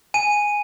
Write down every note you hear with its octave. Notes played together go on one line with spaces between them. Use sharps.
G#5 D#7